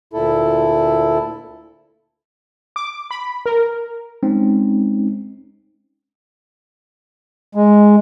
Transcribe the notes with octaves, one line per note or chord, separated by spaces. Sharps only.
D2 A#2 E4 A4
D6
B5
A#4
G#3 C4 C#4 D#4
G#3